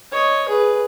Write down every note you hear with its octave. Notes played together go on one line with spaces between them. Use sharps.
C#5 D#5
G#4 B4